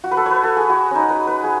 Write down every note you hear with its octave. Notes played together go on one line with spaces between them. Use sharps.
F#4
B4
A4
B4 C#5
A4
G#4
F#4
C#4 D#4
B4
B4
G#4